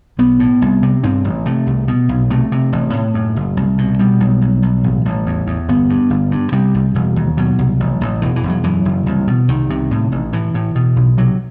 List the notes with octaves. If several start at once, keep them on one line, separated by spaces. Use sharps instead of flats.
B1 B3
A2
C2
C3
G2 C4
A1
C3 A3
C2
B2
B1
C3 A3
C3
A1
A2
F#2
F#1
C2
B2
B2 G3
B1
B1
B1
A1
A1
E2
E2
G1 B3
G2
G1
G2
C3 G3
C2
E1
D#2
B2 F#3
C2
A1
A1
E1 E3
E3
E1
F#3
F#2 E3
F#1
C2
B2
C2 D#3
C3
A2
A1
A2 E3
A2
B2
B1
C3 F#3